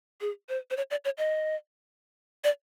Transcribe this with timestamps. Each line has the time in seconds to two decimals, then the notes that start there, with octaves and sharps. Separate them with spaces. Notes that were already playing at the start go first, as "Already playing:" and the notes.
0.21 G#4
0.49 C5
0.71 C5
0.77 C#5
0.91 D5
1.05 C#5
1.18 D#5
2.44 D5